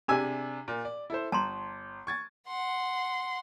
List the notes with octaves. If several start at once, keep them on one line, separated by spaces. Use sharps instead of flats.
C3 D4 G4 G#4 G#5 E6
A#2
D5
E4 A4 C5
G1 A5 A#5 C6
C#6 G#6 A6
F#5 C6